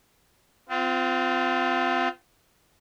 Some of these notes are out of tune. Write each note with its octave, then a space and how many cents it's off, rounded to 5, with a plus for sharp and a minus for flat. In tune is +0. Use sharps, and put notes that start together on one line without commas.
C4 -30 F4 +0